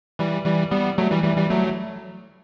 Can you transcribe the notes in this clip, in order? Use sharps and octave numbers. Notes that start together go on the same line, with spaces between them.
E3 G3
E3 G3
G3 B3
F#3 A3
E3 G3
E3 G3
E3 G3
F#3 A3